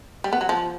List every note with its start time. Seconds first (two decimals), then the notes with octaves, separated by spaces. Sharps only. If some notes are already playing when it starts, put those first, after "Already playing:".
0.24 G3
0.33 B3
0.41 F#3
0.49 F3